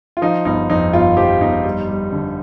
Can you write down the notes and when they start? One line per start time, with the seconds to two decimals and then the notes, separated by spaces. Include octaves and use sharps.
0.17 F4
0.22 F3 D#4
0.45 G1 D#4
0.70 F2 D#4
0.93 G1 F4
1.17 F3 G4
1.41 G1 D#4
1.64 G3
1.89 G3
2.12 D3